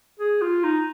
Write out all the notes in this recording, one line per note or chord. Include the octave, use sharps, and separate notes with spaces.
G#4
F4
D#4